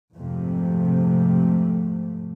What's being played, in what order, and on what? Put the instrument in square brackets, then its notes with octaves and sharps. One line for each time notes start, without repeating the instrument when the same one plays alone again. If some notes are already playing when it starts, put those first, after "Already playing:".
[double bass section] F2 G#2 C3 A3